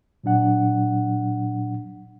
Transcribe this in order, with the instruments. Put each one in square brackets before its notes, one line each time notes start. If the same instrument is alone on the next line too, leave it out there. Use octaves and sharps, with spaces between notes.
[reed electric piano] A#2 F#3 D4 F#5